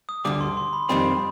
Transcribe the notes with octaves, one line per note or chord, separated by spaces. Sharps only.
D#6
D2 D3 G3 D6
C6
C6
B5
F2 D#3 G3 C4 B5